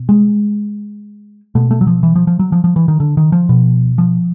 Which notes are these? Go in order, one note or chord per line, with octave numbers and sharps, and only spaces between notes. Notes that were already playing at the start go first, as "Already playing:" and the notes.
Already playing: B2
G#3
B2 A3
A3
F#3
F3
E3
F3
F3
F#3
F3
F3
E3
D#3
D3
D#3
F3
B2
F3